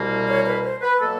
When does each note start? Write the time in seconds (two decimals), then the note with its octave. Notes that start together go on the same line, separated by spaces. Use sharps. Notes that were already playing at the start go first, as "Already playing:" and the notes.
Already playing: C2 B2 G3 A#3
0.29 C#5
0.46 B4
0.64 C5
0.82 B4
0.99 B2 F#3 A#3 A4